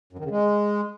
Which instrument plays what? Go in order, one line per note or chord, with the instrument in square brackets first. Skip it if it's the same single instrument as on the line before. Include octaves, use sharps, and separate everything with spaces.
[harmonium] F#2
D#3
C#3
G#3